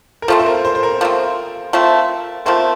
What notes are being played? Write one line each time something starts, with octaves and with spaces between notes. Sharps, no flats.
A#4
F3 A3 C4 A4
C5
A#4
C5
C5
A#4
F3 A3 C4
F3 A3 C4
F3 A3 C4 A#4